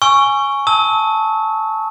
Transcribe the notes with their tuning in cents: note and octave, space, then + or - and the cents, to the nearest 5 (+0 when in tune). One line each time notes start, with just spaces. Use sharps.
G#5 +0 C#6 +0 E6 +45
A5 +0 E6 -40